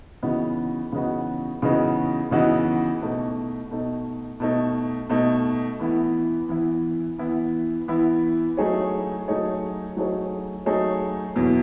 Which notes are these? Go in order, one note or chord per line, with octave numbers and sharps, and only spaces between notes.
C#3 E3 B3 D#4 F#4
C#3 E3 B3 D#4 F#4
C#3 E3 B3 D#4 F#4
C#3 E3 B3 D#4 F#4
B2 A3 D#4
B2 A3 D#4
B2 A3 D#4
B2 A3 D#4
E3 B3 E4
E3 B3 E4
E3 B3 E4
E3 B3 E4
F#3 A3 D#4 G#4 C#5
F#3 A3 D#4 G#4 C#5
F#3 A3 D#4 G#4 C#5
F#3 A3 D#4 G#4 C#5
E2 B2 F#3